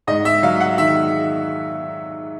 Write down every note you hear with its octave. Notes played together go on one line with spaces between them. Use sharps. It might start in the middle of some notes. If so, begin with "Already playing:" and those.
G#2 D#5
E5
F#3 F5
F#5
D#3 E5